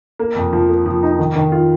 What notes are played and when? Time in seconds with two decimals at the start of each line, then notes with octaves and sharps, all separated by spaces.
0.19 A#3
0.36 F2
0.53 F3
0.69 A#3
0.86 F3
1.03 D#4
1.19 D#3
1.36 D#3
1.52 F4